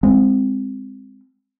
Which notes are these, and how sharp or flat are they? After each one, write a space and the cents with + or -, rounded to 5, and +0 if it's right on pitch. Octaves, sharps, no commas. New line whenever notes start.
G#3 -25 C4 +0